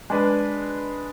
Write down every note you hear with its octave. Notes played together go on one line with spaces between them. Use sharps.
G#3 D4 G#4 B4